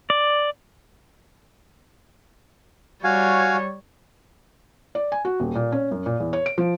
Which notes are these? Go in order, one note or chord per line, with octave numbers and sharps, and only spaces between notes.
D5
G3 F#4 C#5 F5 G#5
D5
G#5
F#4
D#1
A#2
C#4
F#2
A#2
E2
C#5
D7
F3